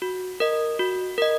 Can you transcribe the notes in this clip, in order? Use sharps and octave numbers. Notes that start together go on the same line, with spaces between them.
F#4
A#4 D#5
F#4
A#4 D#5